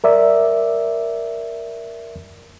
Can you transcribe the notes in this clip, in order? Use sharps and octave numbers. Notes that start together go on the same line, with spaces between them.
A#4 D5 E5